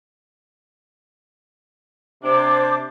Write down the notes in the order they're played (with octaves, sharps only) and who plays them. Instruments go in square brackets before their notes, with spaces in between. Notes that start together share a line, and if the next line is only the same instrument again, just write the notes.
[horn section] C3 D4 [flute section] C5 D6